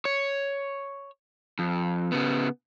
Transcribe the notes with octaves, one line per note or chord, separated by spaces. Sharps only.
C#5
F2
C#3 B3